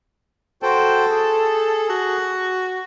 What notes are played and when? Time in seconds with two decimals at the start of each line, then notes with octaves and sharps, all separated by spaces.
0.63 F#4 A4 C5 G5
1.09 G#4
1.89 F#4